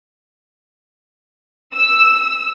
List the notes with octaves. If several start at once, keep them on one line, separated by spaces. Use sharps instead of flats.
E6